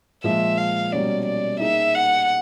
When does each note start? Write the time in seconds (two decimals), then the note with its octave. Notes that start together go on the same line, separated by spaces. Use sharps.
0.24 A#2 F3 G#3 E5
0.58 F5
0.92 B2 G3 A#3 C#4 D5
1.26 D5
1.60 A#3 D#4 G#4 E5
1.95 F#5